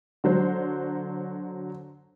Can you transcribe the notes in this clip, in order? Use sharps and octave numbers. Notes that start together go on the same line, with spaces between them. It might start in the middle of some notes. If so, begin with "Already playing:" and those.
D3 F#3 C5